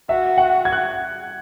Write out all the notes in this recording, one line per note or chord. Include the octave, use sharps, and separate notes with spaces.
F#4 E5
F#5
G#6
F#6